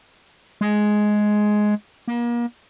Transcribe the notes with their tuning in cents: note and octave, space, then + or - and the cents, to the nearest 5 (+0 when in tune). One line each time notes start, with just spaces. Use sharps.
G#3 +10
A#3 +35